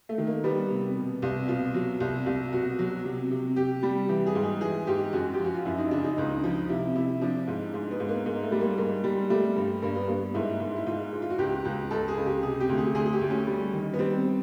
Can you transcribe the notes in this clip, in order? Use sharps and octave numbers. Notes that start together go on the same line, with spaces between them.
A3
D#3
A#3
G3 B3
C3
B2
C2
B2 F4
F#3
C2
C2
B2 F#4
F#3
C3
C3
C3 G4
G3
E3 G4
G#4
G#2
G#4
E3 G#4
G#2 G4
F#2 F#4
G4
F3
F#4
F4
F#2 E4
D#4
C#3 D4
D#4
C#2
F3
C3 E4
C3 E4
F3 D4
G#2
G#2
B3
G#2
A#3
G#2 A#3
A3
G3
A#3
G#2 A#3
G3
G3 A3
G2
G2 A#3
B3
G2 A#3
G#2 E4
G#2
E4
G#2 F4
G#2
F4
F#4
C#2 G4
C#2
C#2 A4
G#4
C#2
G4
C3 G#4
G4
D2
G#4
D2 G#4
G#4
G4
D2
C#4
G3
D#3
B3
G3 C4